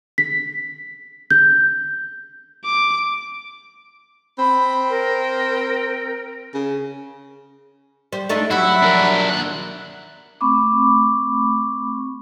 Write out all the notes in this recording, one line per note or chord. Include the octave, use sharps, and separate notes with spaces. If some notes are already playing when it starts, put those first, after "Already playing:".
B6
G6
D6
C4 B5
A#4
C#3
G3 C5
A3 D4 D#4
F#3 G3 E4 E5 F#5 B5
D4 A#4
D#2 F#5
A3 C4 B5 C#6 D6